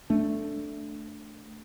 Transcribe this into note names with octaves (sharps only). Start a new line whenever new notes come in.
A3 D4